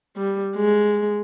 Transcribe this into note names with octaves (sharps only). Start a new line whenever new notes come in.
G3
G#3